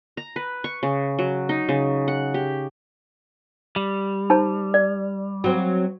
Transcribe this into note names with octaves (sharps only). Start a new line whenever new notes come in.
A#5
B4
C#6
C#3
F#3
D#4
C#3
F#5
G4
G3
D#4 C5 A5
D5
F#3 C4